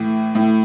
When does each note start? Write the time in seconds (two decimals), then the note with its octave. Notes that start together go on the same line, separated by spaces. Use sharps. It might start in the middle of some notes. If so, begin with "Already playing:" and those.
Already playing: A2 E3
0.35 A2